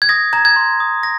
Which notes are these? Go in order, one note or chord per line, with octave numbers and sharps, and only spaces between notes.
G#6
D#6 A#6
A#5 G#6
G#6
C6
D#6
A#6